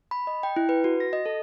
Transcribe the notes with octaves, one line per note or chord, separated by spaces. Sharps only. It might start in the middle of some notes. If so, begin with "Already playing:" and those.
B5
D#5
G5
E4
B4
F#4
A#6
D#5
A4